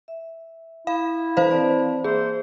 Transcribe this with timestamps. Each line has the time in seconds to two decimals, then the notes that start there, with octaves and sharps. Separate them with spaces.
0.08 E5
0.87 E4 F5
1.37 E3 A4 B4 C5 F5
1.51 C4 D5 A5
2.04 A#3 G#4 C5 E5 E6